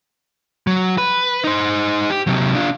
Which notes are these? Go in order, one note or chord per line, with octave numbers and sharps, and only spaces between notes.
F#3
B4
D#4 C5
G4
C3 F#3
D4 F4